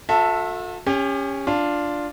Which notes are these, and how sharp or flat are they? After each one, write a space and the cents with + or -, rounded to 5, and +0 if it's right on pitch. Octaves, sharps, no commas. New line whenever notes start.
F#4 -45 A4 +10 E5 +0
C#4 +0 G4 +35
D4 +0 F4 +0